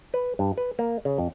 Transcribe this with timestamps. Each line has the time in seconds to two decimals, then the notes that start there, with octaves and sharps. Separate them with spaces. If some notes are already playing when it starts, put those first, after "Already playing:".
0.14 B4
0.39 G2
0.58 B4
0.79 A#3
1.05 C#3
1.18 F2